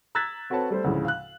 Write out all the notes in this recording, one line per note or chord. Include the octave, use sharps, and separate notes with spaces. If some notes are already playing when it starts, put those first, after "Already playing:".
A#5 E6 F#6 G#6 A6 B6
C4 F#4 A4 B4 C#5 A5
G3 A3 C5
D2 A2 C#3 F3 G#3
F5 F#6